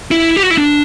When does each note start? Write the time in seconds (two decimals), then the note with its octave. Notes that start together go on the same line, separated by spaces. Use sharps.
0.11 E4
0.36 G4
0.43 F#4
0.50 E4
0.58 D4